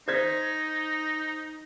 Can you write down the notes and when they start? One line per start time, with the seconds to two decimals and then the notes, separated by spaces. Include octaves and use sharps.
0.08 D#4 C5 G#6 B6